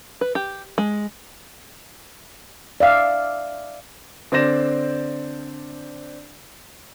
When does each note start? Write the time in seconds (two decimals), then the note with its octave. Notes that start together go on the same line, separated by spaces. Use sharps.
0.21 B4
0.35 G4
0.78 G#3
2.80 D5 E5 F5
4.32 D3 C4 C5 D5 A#6 E7